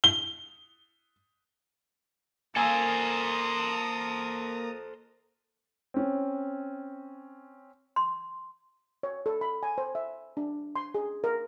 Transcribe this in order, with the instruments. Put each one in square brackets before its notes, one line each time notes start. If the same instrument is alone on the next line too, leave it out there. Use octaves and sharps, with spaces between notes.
[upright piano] G7
[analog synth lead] A#3 [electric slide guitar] A4 C5 [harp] G#5 E6 [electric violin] A#5 D#6
[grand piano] C4 C#4
[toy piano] C6
[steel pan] C#5
A4
B5
G#5
C5
E5
D4
C6
G#4
A#4